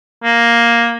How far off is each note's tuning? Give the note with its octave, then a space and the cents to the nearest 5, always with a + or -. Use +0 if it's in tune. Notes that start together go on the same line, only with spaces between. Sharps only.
A#3 +5